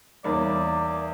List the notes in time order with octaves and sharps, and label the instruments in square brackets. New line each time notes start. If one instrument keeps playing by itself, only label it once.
[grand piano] E2 A#3 [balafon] G3 D#4 C#5 [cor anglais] D5